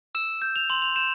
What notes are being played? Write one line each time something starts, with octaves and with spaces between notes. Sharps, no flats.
E6 E7
G6
F7
C6 F#7
F7
G6 E7